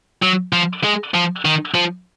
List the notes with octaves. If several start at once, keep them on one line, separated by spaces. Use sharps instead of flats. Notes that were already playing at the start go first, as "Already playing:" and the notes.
F#3
F3
G#3
F3
D#3
F3